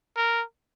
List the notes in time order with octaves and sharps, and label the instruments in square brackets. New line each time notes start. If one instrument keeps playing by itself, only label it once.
[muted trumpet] A#4